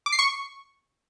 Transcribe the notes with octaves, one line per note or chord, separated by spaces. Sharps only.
D6
C7
C#6